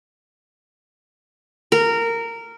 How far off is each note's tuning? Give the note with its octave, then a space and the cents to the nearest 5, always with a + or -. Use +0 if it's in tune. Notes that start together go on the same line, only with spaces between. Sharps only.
A#4 -15